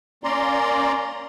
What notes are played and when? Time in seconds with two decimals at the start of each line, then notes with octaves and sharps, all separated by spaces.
0.24 A#3 C#4 D5 A#5 C6